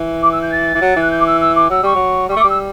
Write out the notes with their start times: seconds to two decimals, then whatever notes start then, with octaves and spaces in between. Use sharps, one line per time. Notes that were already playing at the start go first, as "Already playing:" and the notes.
Already playing: E3
0.22 D6
0.31 E6
0.42 G6
0.51 A6
0.74 E3
0.81 F#3
0.96 E3
1.01 F#6
1.11 G6
1.19 D6
1.26 E6
1.40 E6
1.55 D6
1.70 F#3 E6
1.83 G3 C#6
1.95 F#3
2.29 G3 C#6
2.36 A3
2.39 D6
2.44 G3
2.49 E6